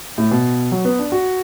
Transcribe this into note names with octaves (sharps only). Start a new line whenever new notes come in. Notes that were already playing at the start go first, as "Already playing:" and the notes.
A2
B2
F#3
B3
D4
F#4